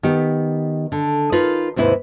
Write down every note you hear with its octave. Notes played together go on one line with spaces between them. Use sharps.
D#3 B3 G4
D3
D#4 F4 A#4 B4
D#2 G#2 C3 E4 B4